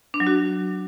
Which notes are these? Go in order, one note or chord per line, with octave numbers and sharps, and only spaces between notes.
D4
F#3
F#4